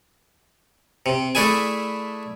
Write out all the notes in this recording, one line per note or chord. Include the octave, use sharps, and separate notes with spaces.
C3
A3 D4 E4 G#4 G#5